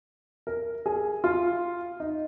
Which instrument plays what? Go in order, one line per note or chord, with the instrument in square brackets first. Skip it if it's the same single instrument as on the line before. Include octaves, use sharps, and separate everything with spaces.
[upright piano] A#4
G#4
F4
D#4